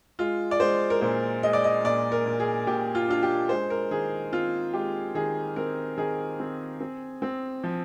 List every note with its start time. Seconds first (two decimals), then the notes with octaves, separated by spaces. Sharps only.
0.19 G#3 F4
0.51 D5
0.60 G#3 C5
0.90 A#4
1.01 A#2 C5
1.43 G#3 D#5
1.53 D5
1.64 D#5
1.84 A#2 D5
2.12 A#4
2.26 A#2
2.40 G#4
2.67 A#2 G4
2.95 F4
3.08 D4 F4
3.23 G4
3.49 G#3 C5
3.70 A#4
3.91 D#3 G#4
4.33 C4 F4
4.73 G#3 G4
5.15 D#3 G#4
5.56 C4 A#4
5.98 D#3 G#4
6.40 C4
6.80 C4
7.22 C4
7.64 F3